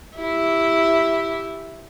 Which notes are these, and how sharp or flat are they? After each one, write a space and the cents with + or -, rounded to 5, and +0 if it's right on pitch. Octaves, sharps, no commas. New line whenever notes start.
E4 +0 G4 +0